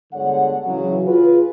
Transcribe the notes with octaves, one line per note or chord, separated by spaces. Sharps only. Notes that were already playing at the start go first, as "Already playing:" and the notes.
G1 D3 G#3 C#5 F#5
C#3 E3 F#3
F4 G#4 B4